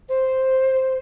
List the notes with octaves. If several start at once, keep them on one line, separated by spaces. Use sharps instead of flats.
C5